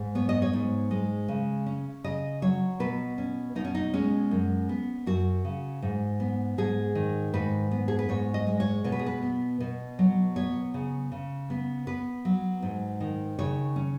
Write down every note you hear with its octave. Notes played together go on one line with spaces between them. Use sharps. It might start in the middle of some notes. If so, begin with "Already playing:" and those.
Already playing: G#2
B3 C#5
D#5
C#5
G#2
G#3
C#3
C#4
C#3 D#5
F#3 C#5
B2 B4
C#4
B2 D#4
C#4
D#4
G#3 C#4
F#2
B3
F#2 F#4
C#3
G#2
B3
G#2 G#4
D#3
G#2 B4
B3
G#4
B4
G#2 C#5
D#5
G#3
C#5
B2 C#5
B4
G#4
B4
B3
B2
F#3
B3 C#5
C#3
C#3
B3
B3 B4
F#3
G#2
D#3
C#3 C#5
C#4